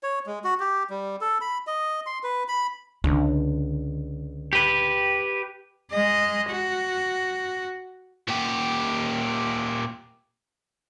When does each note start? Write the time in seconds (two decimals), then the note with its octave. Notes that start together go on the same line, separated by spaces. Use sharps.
0.03 C#5
0.26 G#3
0.44 F#4
0.60 G4
0.90 G3
1.21 A4
1.41 B5
1.67 D#5
2.06 C6
2.24 B4
2.48 B5
3.04 C#2 D3
4.53 G4 B4
5.92 G#3 D#5
6.50 F#4
8.28 A#2 G4